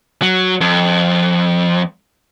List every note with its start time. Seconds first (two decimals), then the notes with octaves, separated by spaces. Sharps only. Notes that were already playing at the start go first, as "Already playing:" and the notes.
0.22 F#3
0.61 F2